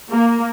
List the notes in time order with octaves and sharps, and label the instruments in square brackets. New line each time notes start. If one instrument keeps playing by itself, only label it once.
[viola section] A#3